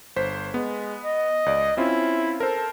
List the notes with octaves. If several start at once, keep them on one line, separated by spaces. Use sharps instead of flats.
G1 C5 B6
G#3 B3
D#5
C#2 D5
C4 C#4 E4 F4
A4 A#4 C5